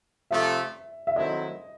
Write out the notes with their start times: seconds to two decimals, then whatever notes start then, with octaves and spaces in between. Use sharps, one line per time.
0.30 C3 F3 A3 E5
1.07 E5
1.16 D#3 F#3 A3 C4 E4 D#5